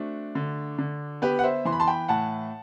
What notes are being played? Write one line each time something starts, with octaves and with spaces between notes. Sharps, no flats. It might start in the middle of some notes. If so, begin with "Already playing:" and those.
Already playing: A3 C4 D4 F#4
D3
D3
B3 G4 B4
F#5
C5 E5
E3 C6
B5
A5 C6
G5 B5
A2 F#5 A5